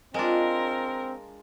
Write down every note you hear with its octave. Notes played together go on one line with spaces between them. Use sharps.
G#3 C4 D4 F4 A#4